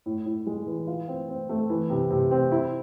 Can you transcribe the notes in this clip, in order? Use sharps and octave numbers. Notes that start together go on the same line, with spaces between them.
A2
A2
G#3
E3
F4
C4
C4
A3
E3
C3
C3
C4
E4